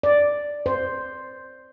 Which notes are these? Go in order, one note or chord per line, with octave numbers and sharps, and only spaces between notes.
D5
C5